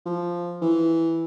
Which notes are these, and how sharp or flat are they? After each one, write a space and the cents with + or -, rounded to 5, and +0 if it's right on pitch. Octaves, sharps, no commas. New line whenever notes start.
F3 -5
E3 -5